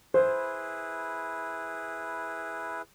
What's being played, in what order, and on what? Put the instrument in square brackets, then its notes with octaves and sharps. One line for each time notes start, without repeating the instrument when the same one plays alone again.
[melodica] E4 G#4 B4 [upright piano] C5